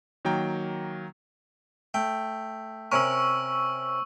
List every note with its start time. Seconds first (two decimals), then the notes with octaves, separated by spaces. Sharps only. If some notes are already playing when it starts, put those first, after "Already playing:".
0.25 D#3 F#3 A#3 G5 A#5
1.94 A3 G5
2.92 C3 C#4 A#4 C#6 E6